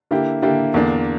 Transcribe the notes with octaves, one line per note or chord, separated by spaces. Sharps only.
D3 A#3 E4 G4
D3 A#3 E4 G4
E2 D3 A#3 D4